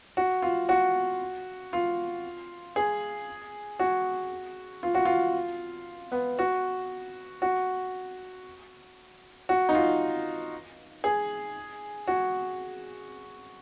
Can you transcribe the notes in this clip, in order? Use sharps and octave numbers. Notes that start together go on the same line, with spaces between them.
F#4
F4
F#4
F4
G#4
F#4
F4
F#4
F4
B3
F#4
F#4
F#4
D#4
F4
G#4
F#4